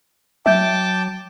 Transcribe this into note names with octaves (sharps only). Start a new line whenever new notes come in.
F#3 E5 G5 A5 D6 G6